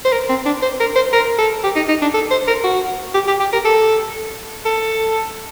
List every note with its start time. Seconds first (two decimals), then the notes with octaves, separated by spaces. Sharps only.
0.05 C5
0.12 A#4
0.29 C4
0.46 D4
0.62 C5
0.80 A#4
0.96 C5
1.13 A#4
1.38 A4
1.64 G4
1.76 D#4
1.88 D#4
2.02 D4
2.14 A4
2.30 C5
2.47 A#4
2.64 F#4
3.14 G4
3.27 G4
3.40 G4
3.52 A#4
3.65 A4
4.65 A4